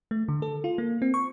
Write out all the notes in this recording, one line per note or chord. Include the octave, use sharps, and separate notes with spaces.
A3
D3
A4
F4
A#3
C4
C#6